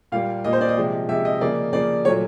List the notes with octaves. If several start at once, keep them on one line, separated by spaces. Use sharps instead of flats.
A#2 G3 A#3 F5
A#2 G3 A#3 D#5
C5
D5
D#5
C3 F3 G#3
C3 F3 G#3 E5
D#5
C#3 F3 A#3 D5
C#3 F3 A#3 D5
A#2 F#3 A3 C#5